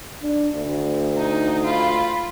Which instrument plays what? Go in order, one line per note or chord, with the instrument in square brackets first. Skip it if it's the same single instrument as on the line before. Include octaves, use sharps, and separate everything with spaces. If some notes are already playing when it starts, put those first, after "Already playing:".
[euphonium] D4
D2
[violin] D#4
F4 B5